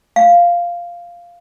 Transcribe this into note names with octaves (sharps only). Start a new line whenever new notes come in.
F5